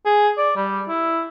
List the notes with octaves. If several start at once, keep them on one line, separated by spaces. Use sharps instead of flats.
G#4
D5
G3
E4